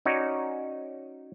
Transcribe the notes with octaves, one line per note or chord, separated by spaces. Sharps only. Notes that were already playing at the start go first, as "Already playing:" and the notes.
C#4 D#4 F#4 C#5 D5